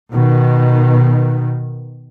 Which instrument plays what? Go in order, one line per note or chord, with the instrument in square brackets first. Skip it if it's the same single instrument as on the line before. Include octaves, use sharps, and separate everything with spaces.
[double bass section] B2 D#3